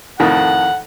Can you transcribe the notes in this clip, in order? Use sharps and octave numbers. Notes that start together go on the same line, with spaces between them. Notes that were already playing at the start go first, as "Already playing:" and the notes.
F2 A2 D#3 F#5